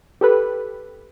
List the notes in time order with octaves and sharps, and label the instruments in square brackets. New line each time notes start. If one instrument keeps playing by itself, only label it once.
[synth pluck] G4 A4 B4